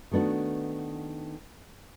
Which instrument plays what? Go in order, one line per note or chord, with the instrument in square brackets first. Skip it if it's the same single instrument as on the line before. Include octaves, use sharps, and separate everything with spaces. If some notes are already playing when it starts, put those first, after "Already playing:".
[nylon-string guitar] D#3 A3 B3 D4 F#4